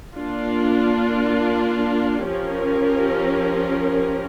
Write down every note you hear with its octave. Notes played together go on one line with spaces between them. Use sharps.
A#3 D4 F4
F3 C#4 G4 A#4